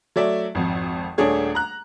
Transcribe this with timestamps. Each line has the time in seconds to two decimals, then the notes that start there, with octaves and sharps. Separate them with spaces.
0.16 F#3 A3 D5 E5
0.55 G#1 F2
1.18 D#1 A3 D4 G#4 C#5
1.55 A#5 F#6